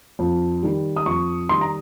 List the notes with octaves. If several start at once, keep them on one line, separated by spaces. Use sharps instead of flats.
F2
D#3 G3
D#6
F2 C#6
D#3 G3 C6
A#5